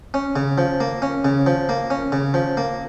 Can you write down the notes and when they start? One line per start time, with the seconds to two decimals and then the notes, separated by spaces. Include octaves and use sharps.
0.14 C#4
0.36 C#3
0.58 F3
0.80 A#3
1.02 C#4
1.25 C#3
1.46 F3
1.69 A#3
1.90 C#4
2.12 C#3
2.34 F3
2.57 A#3